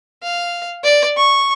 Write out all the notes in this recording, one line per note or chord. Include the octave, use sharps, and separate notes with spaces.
F5
D5
C#6